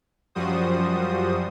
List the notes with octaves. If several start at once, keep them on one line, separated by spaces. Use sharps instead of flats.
F#2 F3 G3 F#4 C5 D#6